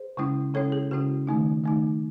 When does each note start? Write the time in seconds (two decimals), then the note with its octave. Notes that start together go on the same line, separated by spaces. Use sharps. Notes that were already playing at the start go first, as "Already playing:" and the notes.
Already playing: G#4 C5
0.17 C#3 G#3 C#4 E4
0.54 C#3 G#3 C#4 E4 A4 C#5
0.72 G#4
0.91 C#3 G#3 C#4 E4 F#4
1.27 D#3 A3 D#4
1.64 D#3 A3 D#4